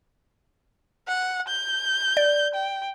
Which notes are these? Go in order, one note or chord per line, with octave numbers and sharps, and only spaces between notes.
F#5
G6
D5
G5